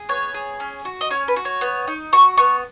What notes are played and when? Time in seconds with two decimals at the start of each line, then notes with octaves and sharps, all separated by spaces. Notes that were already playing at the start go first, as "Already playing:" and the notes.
Already playing: G#4
0.09 B3 C#5
0.34 G#4
0.60 C#4
0.85 F#4
1.01 D#5
1.10 C#4 C#5
1.28 B4
1.36 F#4
1.45 C#5
1.61 B3
1.88 D#4
2.13 F#4 C#6
2.38 B3 C#6